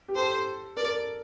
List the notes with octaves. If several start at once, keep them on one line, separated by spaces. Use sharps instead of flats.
G4
A4 C5
A#4 D5